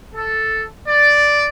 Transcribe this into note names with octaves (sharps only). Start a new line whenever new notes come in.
A4
D5